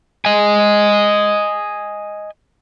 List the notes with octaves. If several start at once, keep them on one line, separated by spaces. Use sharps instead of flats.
D#5 G#5